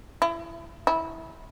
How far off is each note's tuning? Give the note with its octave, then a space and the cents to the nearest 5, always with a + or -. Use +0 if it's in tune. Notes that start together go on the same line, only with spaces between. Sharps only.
E4 +25
E4 -15